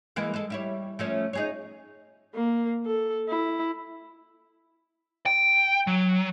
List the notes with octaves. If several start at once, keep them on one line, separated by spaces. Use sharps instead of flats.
E3 G#3 A#3
G#3 A4
G3 E4 C#5
F3 A3 C#4
D#4 G#4 C#5
A#3
A4
E4
G5
F#3